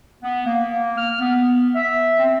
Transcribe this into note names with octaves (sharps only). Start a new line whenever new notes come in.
B3
A#3
F6
B3
E5
C4